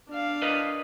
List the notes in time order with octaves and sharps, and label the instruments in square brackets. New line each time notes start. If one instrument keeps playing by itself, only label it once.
[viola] D4 F5
[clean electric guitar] A#4 B4 D#5